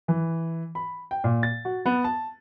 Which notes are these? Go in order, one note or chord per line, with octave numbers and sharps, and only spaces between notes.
E3
B5
G5
A#2
A6
F#4
B3
A5